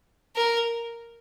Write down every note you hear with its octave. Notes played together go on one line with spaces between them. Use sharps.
A#4